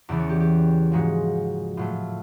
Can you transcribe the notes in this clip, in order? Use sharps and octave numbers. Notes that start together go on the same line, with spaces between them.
E2 C#3 E3 D5
C#5
G4
G4
G#2 F3 G#3 F#4
A2 F#3 A3 F4